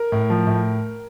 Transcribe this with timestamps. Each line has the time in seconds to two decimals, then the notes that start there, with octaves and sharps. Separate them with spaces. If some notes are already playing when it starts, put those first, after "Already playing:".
Already playing: A#4
0.12 A2
0.30 F3
0.47 A2